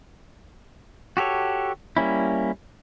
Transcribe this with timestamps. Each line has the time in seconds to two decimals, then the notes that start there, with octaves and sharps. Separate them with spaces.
1.17 F#4 G4 A4 C#5
1.97 G3 A#3 C#4 E4